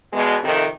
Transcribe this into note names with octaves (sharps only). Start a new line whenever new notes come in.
E2 B2 G#3
F2 C3 D#3